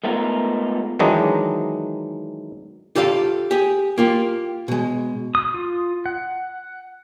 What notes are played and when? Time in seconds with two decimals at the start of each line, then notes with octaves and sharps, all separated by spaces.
0.04 G#3 A3 B3 D#4 F4 A#4
0.99 D#3 E3 F#3 G#3 D4 D#4
2.95 F4 G4 A4 D5 F5
3.51 G4 G#4
3.98 A#3 F4 G4
4.68 B2 G#3
5.35 D#6
5.54 F4
6.06 F#5